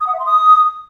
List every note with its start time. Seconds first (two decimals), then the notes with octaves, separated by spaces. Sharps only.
0.01 D#6
0.07 F#5
0.13 E5
0.19 C6
0.26 D#6